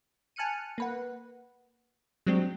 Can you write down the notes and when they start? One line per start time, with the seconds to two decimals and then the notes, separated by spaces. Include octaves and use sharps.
0.36 G#5 A5 F6 F#6 C#7 D#7
0.78 A#3 B4 F#5
2.27 F#3 G#3 C4 D4 G4